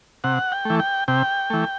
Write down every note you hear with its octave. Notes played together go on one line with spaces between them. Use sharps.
C3 F#5
G5
E3 A3
G5
C3 G5
E3 A3